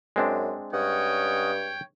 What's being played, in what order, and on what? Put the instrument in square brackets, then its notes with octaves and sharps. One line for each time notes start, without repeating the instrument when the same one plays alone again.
[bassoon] F#2 [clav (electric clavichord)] G#3 C4 D4
[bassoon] G2 [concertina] C#4 D#5 F#5 [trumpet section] C#5 G5